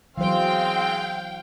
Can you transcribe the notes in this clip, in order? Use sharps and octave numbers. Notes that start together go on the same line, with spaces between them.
E3 F#3 G#3 C4 C5 F5 G5